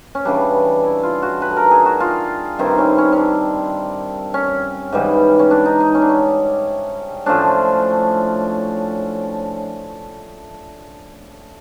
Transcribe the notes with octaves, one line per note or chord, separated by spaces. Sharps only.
C#4
C#3 E3 G3 D4
E4
F4
F#4
B4
A4
A#4
G#4
F#4
F4
G2 D#3 G3 C4 E4
C#4
C#4
C#4
D4
C#4
G#2 E3 G3
C#4
D4
D#4
D#4
C#4
D4
C#4
A2 F3 A3 C#4 D4